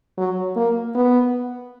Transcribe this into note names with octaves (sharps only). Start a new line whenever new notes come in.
F#3
A#3
B3